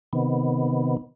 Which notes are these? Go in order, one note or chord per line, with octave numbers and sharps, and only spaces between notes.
C3 D#3 B3